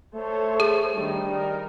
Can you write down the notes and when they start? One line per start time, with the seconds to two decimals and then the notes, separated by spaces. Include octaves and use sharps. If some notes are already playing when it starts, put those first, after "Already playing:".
0.15 A3 A4 C5 C#5
0.60 G#4
0.95 D#3 G3 D4 D#4
1.30 D#4 A#4